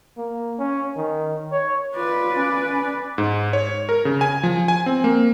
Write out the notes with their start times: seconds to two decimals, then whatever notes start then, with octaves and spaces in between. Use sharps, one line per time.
0.17 A#3
0.59 C#4
0.96 D#3
1.52 C#5
1.95 F4 B4 D5
2.35 C#4
3.18 G#2
3.53 C#5
3.89 A#4
4.05 C#3
4.21 G#5
4.43 F3
4.68 G#5
4.86 C4
5.04 A#3